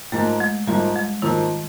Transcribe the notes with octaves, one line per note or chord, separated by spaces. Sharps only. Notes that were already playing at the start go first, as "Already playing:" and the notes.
G#2 F3 A3 A#3
G#3
G#2 F3 G3 A#3
G#3
G#2 D#3 F3 A#3